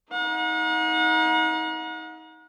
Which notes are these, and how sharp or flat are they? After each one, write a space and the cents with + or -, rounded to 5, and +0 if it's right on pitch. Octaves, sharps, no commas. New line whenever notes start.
D#4 +30 F#5 -40